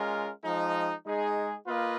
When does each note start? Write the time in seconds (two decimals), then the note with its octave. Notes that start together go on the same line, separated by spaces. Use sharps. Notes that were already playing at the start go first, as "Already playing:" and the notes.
Already playing: G#3 C#4 F4 A#4
0.42 F3 G#3 D#4
1.04 G#3 D#4 G#4
1.66 A#3 F4 B4 D#5